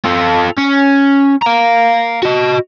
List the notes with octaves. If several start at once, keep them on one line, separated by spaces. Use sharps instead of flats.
F4 A4
C#4
F5 A#5
F#4 D#5